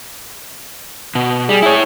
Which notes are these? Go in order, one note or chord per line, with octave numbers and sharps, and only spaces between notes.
B2
G3 G#4
E4 C#5